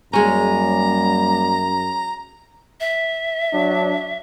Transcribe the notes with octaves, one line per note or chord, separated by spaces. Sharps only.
F#2 G3 G#3 A#3 C#4 A#5
E5
F#3 D4